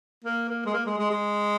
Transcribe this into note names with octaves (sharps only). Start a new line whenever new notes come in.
A#3
A#3
G#3
A#3
G#3
G#3
G#3